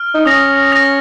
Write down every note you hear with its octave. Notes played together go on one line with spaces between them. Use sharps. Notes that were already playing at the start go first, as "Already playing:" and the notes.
Already playing: F6
D#4
C#4 D#6 A#6 F7
D#6 A#6 F7